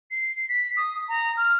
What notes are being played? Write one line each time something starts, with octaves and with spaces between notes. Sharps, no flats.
C7
B6
D#6
A#5
F6